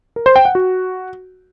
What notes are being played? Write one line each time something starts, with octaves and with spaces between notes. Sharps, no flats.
A#4
C5
G5
F#5
F#4